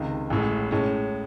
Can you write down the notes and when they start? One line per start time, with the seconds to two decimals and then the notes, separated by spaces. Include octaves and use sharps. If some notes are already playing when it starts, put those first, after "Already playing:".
Already playing: C#2 C3 D#3
0.30 A1 A2 G#3
0.71 A2 G#3 C#4